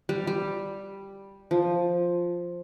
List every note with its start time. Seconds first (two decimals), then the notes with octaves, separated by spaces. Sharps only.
0.09 G3
0.27 G3
1.51 F3